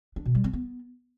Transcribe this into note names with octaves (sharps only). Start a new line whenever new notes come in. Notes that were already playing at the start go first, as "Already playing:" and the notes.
D4
B2
G3
C4
B3